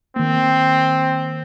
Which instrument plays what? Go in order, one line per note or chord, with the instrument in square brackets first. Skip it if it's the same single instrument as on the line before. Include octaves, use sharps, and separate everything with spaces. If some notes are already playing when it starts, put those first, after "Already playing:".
[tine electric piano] D#3 A#3 [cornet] C4